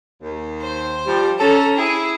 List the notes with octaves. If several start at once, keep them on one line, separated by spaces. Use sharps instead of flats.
D#2
C5
F3 G3
C#4 A4 A#5
E4 G#4